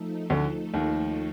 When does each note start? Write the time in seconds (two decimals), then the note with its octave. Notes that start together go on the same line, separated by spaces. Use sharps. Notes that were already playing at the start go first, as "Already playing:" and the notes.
Already playing: F3 A3 D#4 A4
0.30 D2 D3
0.74 D#2 D#3